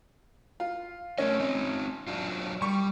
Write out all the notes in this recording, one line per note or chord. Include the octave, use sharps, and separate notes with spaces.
F4
A3 C#4 A#4 D#5
C4 D#4
F#3 D4 F4
G3 C#6